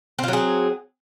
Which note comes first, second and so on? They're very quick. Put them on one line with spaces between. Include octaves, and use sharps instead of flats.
C4 F4 F#3 G#4